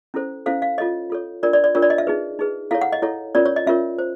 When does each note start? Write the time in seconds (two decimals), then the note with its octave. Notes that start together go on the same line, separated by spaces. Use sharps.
0.14 C#4 E4 A4 C5
0.46 C#4 E4 A4 C5 F5
0.62 F5
0.78 F4 A4 C#5 D#5
1.10 F4 A4 C#5
1.43 D4 F4 A#4 D5
1.53 D5
1.64 D5
1.75 D4 F4 A#4 C#5
1.82 D5
1.90 D#5
1.98 E5
2.07 D#4 G#4 B4
2.39 D#4 G#4 B4
2.71 E4 A4 C#5 F5
2.81 F#5
2.92 D#5
3.02 E4 A4 C#5
3.35 C#4 F4 A#4 C#5 D5
3.46 C#5
3.56 D#5
3.66 C#4 F4 A#4 C#5 E5
3.98 C5